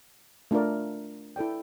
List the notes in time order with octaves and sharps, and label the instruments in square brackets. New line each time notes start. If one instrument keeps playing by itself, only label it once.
[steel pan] A3 D4 F4 A#4 D5
E4 A4 D5 G5